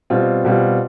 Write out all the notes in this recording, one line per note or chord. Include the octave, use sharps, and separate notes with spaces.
B2 G3 C4 F4
B2 G3 C4 F4